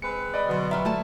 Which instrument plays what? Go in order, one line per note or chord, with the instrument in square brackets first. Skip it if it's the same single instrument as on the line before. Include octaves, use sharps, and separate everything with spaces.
[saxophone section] G#3 C4 B4 [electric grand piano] C#7
[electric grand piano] D5 D#5 B5
[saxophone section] B2 [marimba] D3 F#3 C6
[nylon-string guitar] G3 D#5 [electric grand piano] E5 B5 [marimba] A#5 F6
[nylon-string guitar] A3 G#5 A5